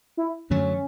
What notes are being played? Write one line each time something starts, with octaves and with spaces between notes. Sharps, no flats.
E4
F#2 D3 F#3 A3 C#4